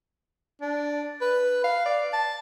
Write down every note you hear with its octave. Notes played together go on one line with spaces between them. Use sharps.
D4
B4
F5
D5
A5